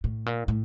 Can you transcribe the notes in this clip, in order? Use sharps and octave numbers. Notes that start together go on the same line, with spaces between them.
A2
A#2
A2